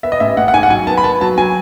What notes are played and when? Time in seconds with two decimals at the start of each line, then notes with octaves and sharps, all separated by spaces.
0.03 B3 E5
0.12 D#5
0.20 A1 E5
0.37 A1 F#5
0.48 F#5
0.54 G#2 G#5
0.63 F#5
0.70 F#3 G#5
0.87 B3 A5
0.97 B5
1.04 B3 A5
1.21 F#3 A5
1.38 F#3 G#5